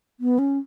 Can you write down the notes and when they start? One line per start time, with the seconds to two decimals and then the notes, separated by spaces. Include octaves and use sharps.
0.20 B3
0.39 C#4